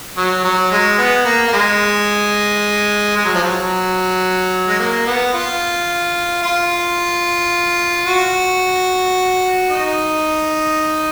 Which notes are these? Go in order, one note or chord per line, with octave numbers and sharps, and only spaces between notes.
F#3
F#3
G#3
B3
A#3
A#3
G#3
G#3
F#3
F3
F#3
G#3
A#3
B3
F4
F4
F#4
D#4